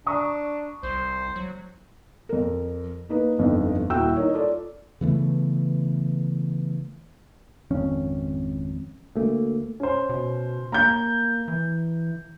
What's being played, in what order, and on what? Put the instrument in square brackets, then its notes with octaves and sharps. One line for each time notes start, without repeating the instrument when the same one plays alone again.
[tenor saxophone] D4 [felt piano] A#5 C#6 D#6
[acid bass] C2 [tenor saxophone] C5
[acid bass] F#3
[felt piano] F2 A#4
A#3 D#4 B4
G1 F2 D#4
D#1 E4 F#4 G5 E6
D#4 A#4 C#5
F4 A4 D5
[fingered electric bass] C#3 E3 A3 B3
[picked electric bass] G#1 F2 C#4
D2 A3 A#3
[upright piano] C#4 C5
[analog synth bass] B2
[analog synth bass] A#3 [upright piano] A#5 G6
[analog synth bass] E3